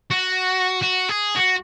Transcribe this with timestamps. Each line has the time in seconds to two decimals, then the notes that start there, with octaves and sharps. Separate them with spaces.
0.10 F#4
0.82 F#4
1.09 G#4
1.36 F#4